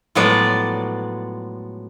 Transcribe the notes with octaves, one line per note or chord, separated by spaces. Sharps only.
A2 F3 F#3 G#3 B3 D5